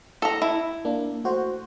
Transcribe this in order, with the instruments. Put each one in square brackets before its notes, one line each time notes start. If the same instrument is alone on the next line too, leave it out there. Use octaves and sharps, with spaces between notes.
[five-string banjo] A4 A#5
E4
[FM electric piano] A#3 D4
A3 F#4 C5